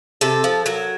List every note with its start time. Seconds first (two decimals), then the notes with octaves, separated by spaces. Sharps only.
0.21 C3 A4
0.44 F3
0.66 F#3 A#4